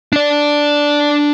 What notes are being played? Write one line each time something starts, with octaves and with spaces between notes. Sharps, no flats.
D4 D5